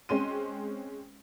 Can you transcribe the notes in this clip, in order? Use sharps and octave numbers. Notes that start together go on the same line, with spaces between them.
G#3 C4 C#4 C6 D#7